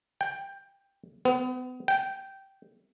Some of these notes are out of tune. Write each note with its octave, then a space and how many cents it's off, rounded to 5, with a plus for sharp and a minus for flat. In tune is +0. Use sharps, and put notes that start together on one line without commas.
G5 +10
B3 +35
G5 -15